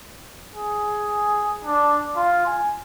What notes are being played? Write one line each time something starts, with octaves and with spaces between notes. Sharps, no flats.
G#4
D4
F4
G#5